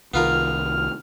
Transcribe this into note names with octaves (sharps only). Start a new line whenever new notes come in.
C2 D#3 B3 F4 A#4 F6